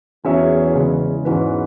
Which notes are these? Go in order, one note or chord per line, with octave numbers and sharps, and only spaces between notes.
E2 F#3 C#4 G#4 C#5 E5
C#3 G#3 C#4
E2 G#2 E3 C#4 F#4 B4